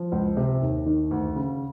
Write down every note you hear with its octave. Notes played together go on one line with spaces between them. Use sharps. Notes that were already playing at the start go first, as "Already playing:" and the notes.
Already playing: F3
C#2
C3
D#2
D#3
D2
C#3